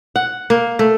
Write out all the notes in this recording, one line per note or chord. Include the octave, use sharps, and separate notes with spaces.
F#5
A#3
A3